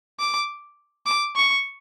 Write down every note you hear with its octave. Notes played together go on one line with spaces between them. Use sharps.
D6
D6
C#6